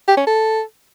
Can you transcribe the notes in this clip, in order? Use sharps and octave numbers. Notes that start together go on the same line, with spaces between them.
G4
C#4
A4